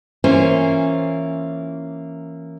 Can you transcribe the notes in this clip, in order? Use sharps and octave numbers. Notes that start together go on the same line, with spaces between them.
E3 A#3 C#4 F4 C5